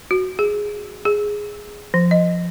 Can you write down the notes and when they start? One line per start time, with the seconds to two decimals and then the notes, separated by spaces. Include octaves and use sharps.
0.11 F#4
0.39 G#4
1.05 G#4
1.94 F3
2.11 D#5